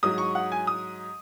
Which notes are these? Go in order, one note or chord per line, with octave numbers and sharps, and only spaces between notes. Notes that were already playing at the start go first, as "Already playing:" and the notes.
G#2 F#3 D#6
C#6
F#5
G#5
D#6